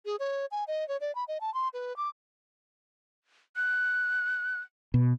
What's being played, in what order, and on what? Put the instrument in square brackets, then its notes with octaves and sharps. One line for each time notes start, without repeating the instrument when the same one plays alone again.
[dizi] G#4
C#5
G#5
D#5
C#5
D5
B5
D#5
A5
C6
B4
D6
[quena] F#6
[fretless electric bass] B2